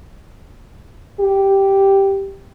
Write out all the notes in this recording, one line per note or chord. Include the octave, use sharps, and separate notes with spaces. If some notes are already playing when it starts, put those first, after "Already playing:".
G4